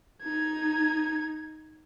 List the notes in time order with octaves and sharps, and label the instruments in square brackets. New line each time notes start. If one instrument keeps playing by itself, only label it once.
[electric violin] D#4 G#6